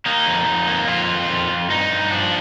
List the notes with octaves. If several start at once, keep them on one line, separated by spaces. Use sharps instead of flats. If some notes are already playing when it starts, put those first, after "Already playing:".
A#3 D#4
F2
F2
A#3
F2 F4
D#3
F2
F2
G2 D#4
G2
F3 D4